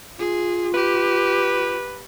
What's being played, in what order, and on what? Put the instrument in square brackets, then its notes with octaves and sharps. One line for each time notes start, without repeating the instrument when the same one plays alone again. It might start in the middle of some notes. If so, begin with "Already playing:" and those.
[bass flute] F4 [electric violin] G#4
[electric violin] G4 [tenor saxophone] B4